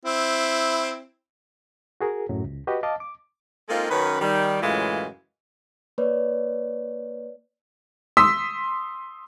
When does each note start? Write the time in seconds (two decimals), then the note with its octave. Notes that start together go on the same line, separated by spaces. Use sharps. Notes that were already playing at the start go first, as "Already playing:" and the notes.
0.05 C4 E4
2.01 F#4 G#4 A#4
2.29 F#2 A2 F#3
2.44 C#2
2.67 F#4 G4 B4 D#5
2.83 D#5 F5 A5 D6
3.00 D6
3.69 G#3 A#3 C4 D#4 F4 A4
3.90 F#2 D#3 C#4 B4
4.21 D#3 G3
4.62 F#2 A2 C#3 E3 G#3 F4
5.98 A#3 B4 C#5 D5
8.17 C6 D#6 E6 B6